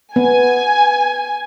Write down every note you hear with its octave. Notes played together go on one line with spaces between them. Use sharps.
B3 G#5